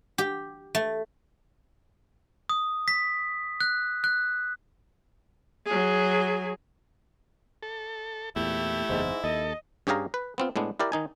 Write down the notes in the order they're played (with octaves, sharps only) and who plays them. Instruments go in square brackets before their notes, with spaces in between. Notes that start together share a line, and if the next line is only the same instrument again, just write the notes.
[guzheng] G4
A3
[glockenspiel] D#6
B6
F#6
F#6
[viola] F#3 G#4
[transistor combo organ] A4
[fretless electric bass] E2 A#2 [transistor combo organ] A3 G4 [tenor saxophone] E4
[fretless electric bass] F#1 E2 [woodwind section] G#2
[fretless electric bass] D#2 [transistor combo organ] A4 [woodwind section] D#5
[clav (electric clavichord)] G2 C#4 G4 G#4 F5 A#5
B4
B3 C4 F4
A2 G#3 B3 D4
E4 G4 A#4 D5
D#3 D#4 G#5